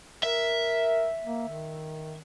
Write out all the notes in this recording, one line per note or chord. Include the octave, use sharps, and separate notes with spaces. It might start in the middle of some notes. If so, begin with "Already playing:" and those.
A#4 E5
A#3
D#3